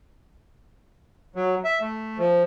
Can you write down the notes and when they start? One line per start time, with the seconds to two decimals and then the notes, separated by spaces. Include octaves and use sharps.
1.35 F#3
1.64 E5
1.81 A3
2.18 F3